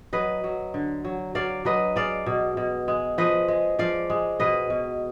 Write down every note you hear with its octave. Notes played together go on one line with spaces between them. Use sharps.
F#3 B4 D#5
F#3
D3
F#3
F#3 D5 F5
F#3 B4 D#5
G#3 D5 F5
B2
B2
G#3
F3 B4 D#5
G#3
F3 D5 F5
G#3
B2 B4 D#5
B2